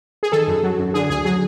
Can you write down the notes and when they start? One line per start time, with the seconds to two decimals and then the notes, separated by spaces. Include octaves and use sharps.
0.23 G#4
0.32 D#3 A4
0.48 F#2
0.63 F#3
0.79 F#2
0.94 D3 G#4
1.10 D2 G#4
1.25 F#3 G#4